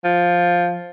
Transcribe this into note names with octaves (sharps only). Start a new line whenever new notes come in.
F3